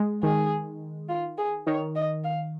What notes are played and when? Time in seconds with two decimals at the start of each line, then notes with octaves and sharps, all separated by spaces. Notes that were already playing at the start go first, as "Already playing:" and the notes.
Already playing: G#3
0.23 D#3 G#4
1.09 F4
1.38 G#4
1.67 D#3 C#5
1.95 D#5
2.24 F5